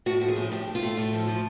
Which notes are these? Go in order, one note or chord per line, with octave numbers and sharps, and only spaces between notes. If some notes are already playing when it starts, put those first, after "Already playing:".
A2 F#4
F3
G#4
A2
A2 G4
A2
F4
A3
A2
F3
F3